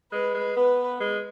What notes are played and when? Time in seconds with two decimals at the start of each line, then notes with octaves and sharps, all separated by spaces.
0.12 G#3 B4
0.34 G#3
0.56 B3 B4
1.00 G#3